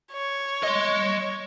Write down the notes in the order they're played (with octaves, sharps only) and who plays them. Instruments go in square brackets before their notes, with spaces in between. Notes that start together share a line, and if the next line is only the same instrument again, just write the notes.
[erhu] C#5
[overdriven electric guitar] D#5 C6